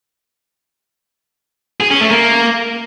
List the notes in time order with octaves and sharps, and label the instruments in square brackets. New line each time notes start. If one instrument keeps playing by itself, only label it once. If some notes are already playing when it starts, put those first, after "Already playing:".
[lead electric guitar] G#4
C#4
A3
A#3